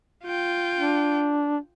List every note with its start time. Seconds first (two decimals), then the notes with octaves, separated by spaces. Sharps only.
0.24 F4 G5
0.78 D4